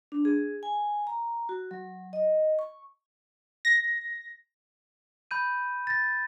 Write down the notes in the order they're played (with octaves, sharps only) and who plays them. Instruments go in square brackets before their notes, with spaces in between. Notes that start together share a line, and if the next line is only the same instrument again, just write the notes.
[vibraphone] D4
G#4
G#5
A#5
F#4
F#3
D#5
C#6
[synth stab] A#6
[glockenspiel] B5 G6 D#7
A6 A#6